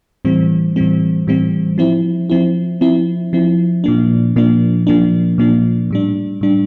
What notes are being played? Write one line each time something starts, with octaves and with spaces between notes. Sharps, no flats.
A2 E3 G3 C4
A2 E3 G3 C4
A2 E3 G3 C4
F3 C4 E4
F3 C4 E4
F3 C4 E4
F3 C4 E4
A#2 F3 A#3 D4
A#2 F3 A#3 D4
A#2 F3 A#3 D4
A#2 F3 A#3 D4
A2 G3 D4
A2 G3 D4